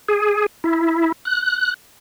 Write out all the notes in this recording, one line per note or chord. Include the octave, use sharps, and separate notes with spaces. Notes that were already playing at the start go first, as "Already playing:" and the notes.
G#4
E4
F#6